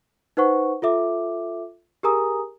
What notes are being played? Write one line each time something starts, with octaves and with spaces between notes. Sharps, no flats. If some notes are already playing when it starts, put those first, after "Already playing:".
D#4 B4 C5 F#5 C#6
F4 A4 E5 D6
G4 G#4 A#4 G#5 A#5 D#6